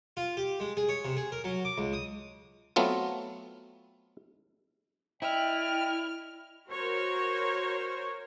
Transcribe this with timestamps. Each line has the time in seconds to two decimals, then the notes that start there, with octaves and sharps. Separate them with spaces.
0.17 F4
0.37 G4
0.60 G#3
0.77 G#4
0.89 C#5
1.05 C3
1.17 G#4
1.32 A#4
1.44 F#3
1.65 D6
1.78 C#2
1.93 D#6
2.76 F#3 A3 B3 C4 F4
5.22 E4 D5 D#5 G5 F6
6.69 F#4 A#4 C5 C#5